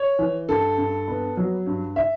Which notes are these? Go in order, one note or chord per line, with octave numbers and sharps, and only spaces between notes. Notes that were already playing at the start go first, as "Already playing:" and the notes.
Already playing: C#5
E3
G2 A4
G2
B3
F#3
G2
E5